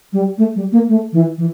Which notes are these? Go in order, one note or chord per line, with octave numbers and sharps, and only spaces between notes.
G3
A3
G3
A#3
A3
E3
E3